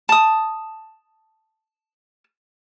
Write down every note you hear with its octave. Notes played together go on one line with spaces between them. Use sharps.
A5 D#6